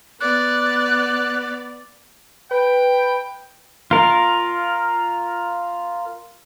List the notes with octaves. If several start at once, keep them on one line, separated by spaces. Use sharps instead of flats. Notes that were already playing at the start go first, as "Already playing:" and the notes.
B3 D5 F#6
B4 G5
F4 A#4